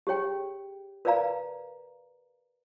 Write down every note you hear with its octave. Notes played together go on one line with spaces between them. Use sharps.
G4 G#4 C#5 G5
A#4 B4 D5 F5 A#5